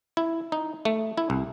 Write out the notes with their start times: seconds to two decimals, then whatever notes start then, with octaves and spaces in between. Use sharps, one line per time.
0.17 E4
0.52 D#4
0.85 A3
1.18 E4
1.30 C2